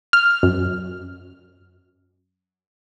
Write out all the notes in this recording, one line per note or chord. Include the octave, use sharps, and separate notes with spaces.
F6
F#2